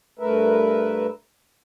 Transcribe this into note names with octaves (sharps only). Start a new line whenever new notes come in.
G2 A3 A#4 B4 E5